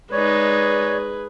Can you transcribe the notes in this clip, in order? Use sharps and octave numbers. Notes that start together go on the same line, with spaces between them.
G#3 D#4 G#4 B4 C#5 D5